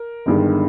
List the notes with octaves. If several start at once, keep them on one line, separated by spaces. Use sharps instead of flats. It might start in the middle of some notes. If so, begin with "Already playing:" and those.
Already playing: A#4
G1 G2 D#3 G#3